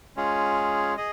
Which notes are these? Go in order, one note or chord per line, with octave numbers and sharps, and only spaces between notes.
G#3 C#4 F4 G#4
G#4 D#5